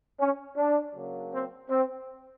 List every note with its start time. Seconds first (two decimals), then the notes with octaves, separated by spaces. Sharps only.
0.18 C#4
0.55 D4
0.94 C#3 F#3 A#3
1.31 C4
1.69 C4